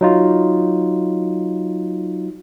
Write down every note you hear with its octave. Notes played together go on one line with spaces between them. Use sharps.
F#3 D#4 F4